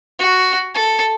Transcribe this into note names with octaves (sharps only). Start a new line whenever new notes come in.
F#4
A4